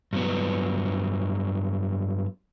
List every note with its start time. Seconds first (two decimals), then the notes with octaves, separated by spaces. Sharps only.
0.13 G2 F#3 B3